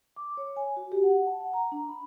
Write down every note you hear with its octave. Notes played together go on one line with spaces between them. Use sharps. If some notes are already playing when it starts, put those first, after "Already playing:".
D6
C#5
G#5
F#4
G4
F#5
A5
F#5
A#5
D4
B5